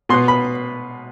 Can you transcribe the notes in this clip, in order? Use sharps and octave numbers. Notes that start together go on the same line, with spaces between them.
B2 B3 C6
B5